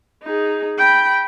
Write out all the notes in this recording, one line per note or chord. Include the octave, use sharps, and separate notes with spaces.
D#4 G#4
G5 B5